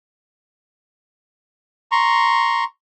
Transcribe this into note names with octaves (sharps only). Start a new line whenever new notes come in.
A#5 C6 C#6